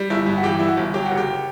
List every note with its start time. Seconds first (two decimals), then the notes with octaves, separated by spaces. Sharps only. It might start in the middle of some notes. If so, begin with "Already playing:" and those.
Already playing: G3
0.10 G1 E4
0.26 G2
0.38 F#4
0.43 E3 G4
0.59 G3 E4
0.68 F#4
0.77 G1
0.94 F#3 G4
1.06 F#4
1.11 F#1
1.17 G4